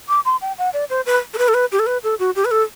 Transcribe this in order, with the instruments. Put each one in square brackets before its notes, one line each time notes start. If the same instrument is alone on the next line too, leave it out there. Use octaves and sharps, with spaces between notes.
[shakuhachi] D6
C6
G5
F#5
D5
C5
B4
A4
B4
A4
B4
G4
A4
B4
A4
F#4
G4
B4
A4